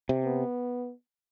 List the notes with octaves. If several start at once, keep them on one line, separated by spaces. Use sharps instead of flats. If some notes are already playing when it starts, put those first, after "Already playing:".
C3
B3